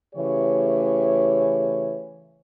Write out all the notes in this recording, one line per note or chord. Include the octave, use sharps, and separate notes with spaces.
C#3 E3 A3 G4 C#5